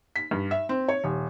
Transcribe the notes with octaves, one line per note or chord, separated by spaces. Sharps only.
B6
G2
E5
C4
C#5
D#1